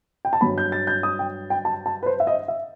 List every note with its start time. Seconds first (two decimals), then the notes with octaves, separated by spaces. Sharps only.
0.25 G5
0.33 A5
0.41 G2 F#3 B5
0.58 G6
0.72 A6
0.87 G6
1.03 D#6
1.19 G5
1.50 G5
1.65 A5
1.86 A5
2.03 B4
2.06 C5
2.20 E5
2.27 D#5
2.48 E5